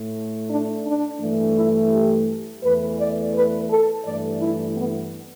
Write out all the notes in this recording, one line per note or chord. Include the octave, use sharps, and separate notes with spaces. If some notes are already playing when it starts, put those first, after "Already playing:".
Already playing: A2 A3
D4
D4
G2 E3 A3
E4
G4
E2 E3 A3 B4
D5
B4
A4
G2 E3 A3 D5
E4
B3